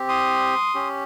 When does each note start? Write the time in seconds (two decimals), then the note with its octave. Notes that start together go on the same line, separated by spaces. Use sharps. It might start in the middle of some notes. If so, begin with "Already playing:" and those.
Already playing: C4 G4
0.09 C6 D#6
0.75 C#4 G4